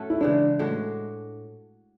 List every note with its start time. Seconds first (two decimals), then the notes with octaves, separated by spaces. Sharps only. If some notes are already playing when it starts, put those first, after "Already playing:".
Already playing: A2 A3 C#4 F#4 A4
0.10 E4
0.21 C#3 E3 G#3 D4
0.59 A2 G#3 D4 F#4